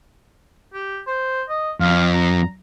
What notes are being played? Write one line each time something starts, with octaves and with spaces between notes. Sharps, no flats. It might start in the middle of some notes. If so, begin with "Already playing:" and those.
G4
C5
D#5
F2 F5
A#5